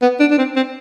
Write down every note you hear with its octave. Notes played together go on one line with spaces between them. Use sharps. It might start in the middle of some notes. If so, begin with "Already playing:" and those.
B3
D4
D4
C4
C4